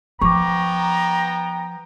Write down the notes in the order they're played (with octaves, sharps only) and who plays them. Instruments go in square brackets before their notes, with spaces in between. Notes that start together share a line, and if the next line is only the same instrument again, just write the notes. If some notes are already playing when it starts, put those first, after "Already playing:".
[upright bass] F3 [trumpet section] B3 G5 A#5 [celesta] C#6 D6